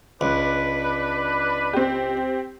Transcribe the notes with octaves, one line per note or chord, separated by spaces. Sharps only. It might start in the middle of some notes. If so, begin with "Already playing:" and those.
C#2 D4 B4
C4 G4